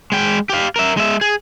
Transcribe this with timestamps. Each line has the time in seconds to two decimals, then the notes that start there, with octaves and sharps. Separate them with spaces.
0.12 G#3 G5
0.50 G4 F5
0.76 A#4 E5
0.97 G#3 E5
1.21 G#4